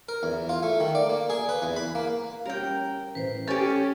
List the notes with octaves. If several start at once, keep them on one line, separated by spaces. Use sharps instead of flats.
A#4
E2
F4
A3
D#3
D5
A#3
G#4
B4
E2
B5
A#3
G3 C#4 A#4 G5
A1 B4 C5
C#4 G4 A4 C#5 A6